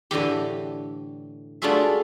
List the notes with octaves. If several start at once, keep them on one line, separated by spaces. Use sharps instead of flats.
A2 D3 E3 G4
A3 D4 F4 F#4 G#4 E5